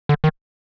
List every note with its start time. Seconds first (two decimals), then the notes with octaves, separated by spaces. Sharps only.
0.09 D3
0.24 D#3